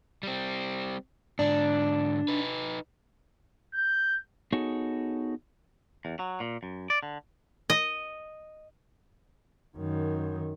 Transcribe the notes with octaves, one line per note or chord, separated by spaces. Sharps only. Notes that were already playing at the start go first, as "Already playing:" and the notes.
G3 C4
G#2 D3 D4
D#4 B4
G6
B3 D#4 F#4 G#4 A4 C#5
E2
F#3
A#2
F#2
D5
D3
D#5
F#2 D#3